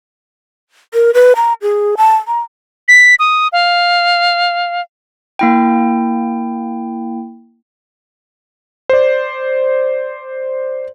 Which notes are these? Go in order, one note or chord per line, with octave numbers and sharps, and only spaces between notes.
A#4
B4
A#5
G#4
A5
A#5
B6
D#6
F5
A#3 E4 G5
C5 D5